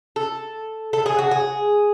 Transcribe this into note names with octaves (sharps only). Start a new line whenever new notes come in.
A4
A4
G#4
F#4
G#4